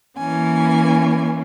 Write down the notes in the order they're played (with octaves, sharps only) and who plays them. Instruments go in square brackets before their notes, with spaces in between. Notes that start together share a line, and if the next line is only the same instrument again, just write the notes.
[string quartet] E3 A#3 C#4 G#5